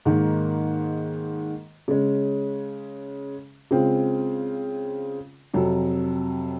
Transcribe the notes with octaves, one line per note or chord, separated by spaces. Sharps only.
G#2 D#3 A#3
C#3 G#3 C#4
C#3 G#3 C4 F4
F2 C3 F#3